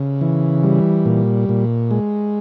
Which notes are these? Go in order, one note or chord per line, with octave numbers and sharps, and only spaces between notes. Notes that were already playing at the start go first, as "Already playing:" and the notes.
Already playing: C#3
E3
G3
A#2
A#2
G#3